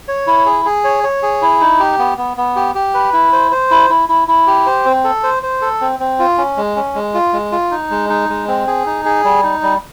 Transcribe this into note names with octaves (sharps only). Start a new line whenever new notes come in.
C#5
E4
G#4
G#4
C#5
C#5
G#4
E4
D#4
G4
B3
B3
B3
G4
G4
B4
E4
C5
C5
E4
E4
E4
E4
G4
C5
C4
A4
C5
C5
A4
C4
C4
F4
C#4
G#3
C#4
G#3
F4
G#3
F4
D#4
G#3
D#4
G#3
C4
G#4
D#4
G#4
G3
D#4
G3